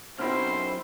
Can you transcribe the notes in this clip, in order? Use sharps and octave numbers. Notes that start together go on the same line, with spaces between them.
B1 F#2 C4 E4 C5 F6